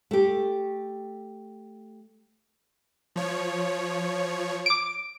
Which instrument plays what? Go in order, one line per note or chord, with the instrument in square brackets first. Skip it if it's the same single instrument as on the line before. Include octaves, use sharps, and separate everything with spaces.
[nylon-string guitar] A3 G4
[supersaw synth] F3 C#5
[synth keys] D6 D7